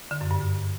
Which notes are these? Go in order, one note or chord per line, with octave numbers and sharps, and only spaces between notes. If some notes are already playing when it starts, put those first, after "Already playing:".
D3
F#2
G2